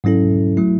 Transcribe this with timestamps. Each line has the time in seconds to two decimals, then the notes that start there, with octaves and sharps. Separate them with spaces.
0.04 G#2 F#3 C#4 E4 A4
0.57 F#3 A3 E4